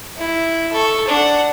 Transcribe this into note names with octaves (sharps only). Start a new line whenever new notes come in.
E4
A4 C#6
D4 F#5